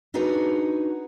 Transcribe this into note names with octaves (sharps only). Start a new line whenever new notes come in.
D4 D#4 F#4 G#4 B4 A#5